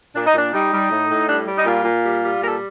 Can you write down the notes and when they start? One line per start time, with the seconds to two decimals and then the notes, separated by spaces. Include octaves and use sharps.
0.15 A#2 D4
0.27 D#4
0.34 A#2 D4
0.53 G3 D#4
0.72 G3
0.91 A2
1.10 A2
1.28 G3 D4
1.47 G3
1.57 D#4
1.66 A#2 F4
1.85 A#2
2.04 G3
2.23 G3
2.41 A#2 A#4
2.48 A4